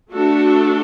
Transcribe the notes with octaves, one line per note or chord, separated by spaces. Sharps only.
A3 D4 F#4 A4